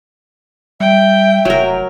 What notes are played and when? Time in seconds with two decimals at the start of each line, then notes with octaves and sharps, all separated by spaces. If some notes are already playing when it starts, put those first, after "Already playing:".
0.80 G3 E5 G5
1.45 F1 F#3 A#4